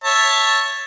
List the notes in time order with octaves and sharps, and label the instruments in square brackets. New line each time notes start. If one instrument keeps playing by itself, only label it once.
[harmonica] C#5 E5 A5